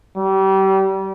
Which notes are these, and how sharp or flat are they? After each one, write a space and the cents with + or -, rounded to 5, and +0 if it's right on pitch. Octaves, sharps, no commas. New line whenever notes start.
G3 -30